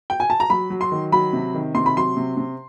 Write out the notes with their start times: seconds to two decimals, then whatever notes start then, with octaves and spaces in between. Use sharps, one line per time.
0.10 G5
0.20 G#5
0.30 A5
0.40 A#5
0.50 F#3 B5
0.70 F#3
0.81 C6
0.92 D#3
1.12 F#3 B5
1.33 C3
1.54 D#3
1.75 C3 C6
1.86 B5
1.96 F#3 C6
2.17 C3
2.37 C3